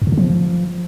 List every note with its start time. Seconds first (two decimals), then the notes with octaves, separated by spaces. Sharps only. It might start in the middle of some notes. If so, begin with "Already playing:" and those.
0.02 F2
0.07 B2
0.12 C#3
0.18 F3